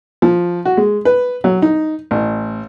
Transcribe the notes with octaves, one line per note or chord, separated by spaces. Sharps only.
F3
F#4
G#3
B4
F#3
D#4
A1